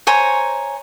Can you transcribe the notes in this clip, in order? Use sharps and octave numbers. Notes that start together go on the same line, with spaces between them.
C5 C#5 G#5 A#5